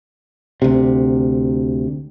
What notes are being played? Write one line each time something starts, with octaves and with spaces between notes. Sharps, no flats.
D2 C3